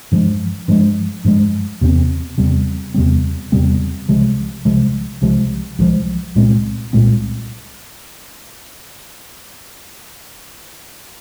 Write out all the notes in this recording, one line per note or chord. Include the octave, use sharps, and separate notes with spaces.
G2 F3 G#3
G2 F3 G#3
G2 F3 G#3
E2 C3 G3 C4
E2 C3 G3 C4
E2 C3 G3 C4
E2 C3 G3 C4
C2 C3 F3 G#3
C2 C3 F3 G#3
C2 C3 F3 G#3
C2 C3 F3 G#3
C2 A#2 G#3 C4
C2 A#2 G#3 C4